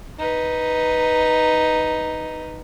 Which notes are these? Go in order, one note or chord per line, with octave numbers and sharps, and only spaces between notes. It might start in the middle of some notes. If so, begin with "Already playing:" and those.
D#4 B4